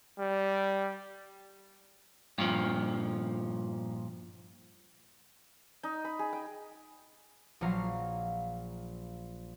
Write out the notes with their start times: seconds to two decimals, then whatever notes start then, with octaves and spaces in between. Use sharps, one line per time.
0.19 G3
2.38 G2 A#2 F3
5.83 D#4
6.05 B5
6.19 G#4
6.33 G5
7.61 A#1 F3 F#3 C#5 F5 A#5